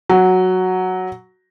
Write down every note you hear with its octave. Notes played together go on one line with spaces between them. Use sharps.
F#3